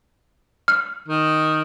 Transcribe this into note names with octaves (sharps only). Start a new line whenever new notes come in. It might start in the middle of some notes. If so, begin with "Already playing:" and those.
F6
D#3